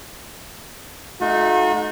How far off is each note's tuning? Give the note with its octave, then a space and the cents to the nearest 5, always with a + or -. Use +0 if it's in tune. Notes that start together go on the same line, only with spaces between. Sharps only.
A3 -35 D#4 +0 F#4 -40